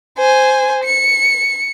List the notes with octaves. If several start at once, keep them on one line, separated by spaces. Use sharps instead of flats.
C5 G#5
C#7